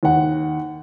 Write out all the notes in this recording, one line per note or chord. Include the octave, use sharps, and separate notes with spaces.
D#2 F#5